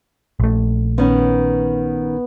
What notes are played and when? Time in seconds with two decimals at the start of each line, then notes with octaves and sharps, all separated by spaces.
0.40 A#1 A3
0.98 D#3 B3 C#4